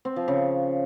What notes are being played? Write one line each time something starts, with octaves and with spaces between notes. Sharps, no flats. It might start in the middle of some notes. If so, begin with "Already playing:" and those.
C4
F3
C#3